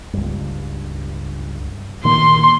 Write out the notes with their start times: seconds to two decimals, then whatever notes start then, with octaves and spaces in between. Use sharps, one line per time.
0.13 C#2 G2
2.05 A#2 D#3 A#3 C6